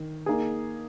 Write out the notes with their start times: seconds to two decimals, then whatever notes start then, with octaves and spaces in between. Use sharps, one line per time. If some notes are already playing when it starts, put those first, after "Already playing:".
Already playing: D#3
0.26 A#3 D#4 G#4